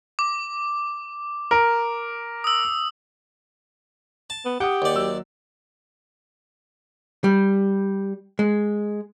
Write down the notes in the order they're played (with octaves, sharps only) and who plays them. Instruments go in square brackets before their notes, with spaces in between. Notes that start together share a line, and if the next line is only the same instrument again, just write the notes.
[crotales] D6
[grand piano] A#4
[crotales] D#6 E6
[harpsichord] A5
[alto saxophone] B3
[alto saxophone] G4 [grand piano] F#5 D#6
[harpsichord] D#2 D5
[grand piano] F#3 E6
[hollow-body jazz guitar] G3
G#3